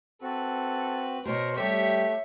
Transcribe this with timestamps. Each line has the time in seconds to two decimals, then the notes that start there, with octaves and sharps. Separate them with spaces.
0.22 C4 F#4 A4 B4
1.26 B2 A#4 C5 C#5
1.56 G3 A3 A#3 G4 C#5 E5